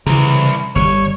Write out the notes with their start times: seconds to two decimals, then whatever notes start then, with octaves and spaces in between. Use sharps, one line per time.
0.06 C2 C#3 E3
0.76 G1 D3 G3 C#5